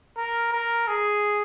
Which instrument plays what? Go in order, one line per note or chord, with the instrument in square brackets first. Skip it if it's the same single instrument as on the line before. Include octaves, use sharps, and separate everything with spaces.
[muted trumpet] A#4
A#4
G#4